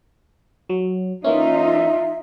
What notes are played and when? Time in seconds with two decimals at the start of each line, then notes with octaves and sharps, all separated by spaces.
0.69 F#3
1.24 E3 A#3 C#4 D#4 F4 E5